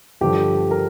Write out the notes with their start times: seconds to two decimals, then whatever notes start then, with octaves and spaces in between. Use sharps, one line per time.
0.21 G2 D3 F3 G4
0.71 A#4